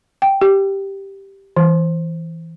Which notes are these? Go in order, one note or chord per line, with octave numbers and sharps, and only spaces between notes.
G5
G4
E3